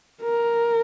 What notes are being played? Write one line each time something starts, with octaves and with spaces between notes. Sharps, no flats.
A#4